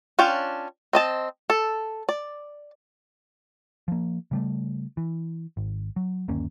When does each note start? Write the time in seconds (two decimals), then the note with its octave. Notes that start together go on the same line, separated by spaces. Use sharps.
0.19 C#4 D4 F4 G5
0.93 C4 D#5 A5
1.50 A4
2.09 D5
3.88 F3 A#3
4.31 C#3 G3 A3
4.97 E3
5.57 G#1
5.96 F#3
6.28 G1 D#2 A#3 C#4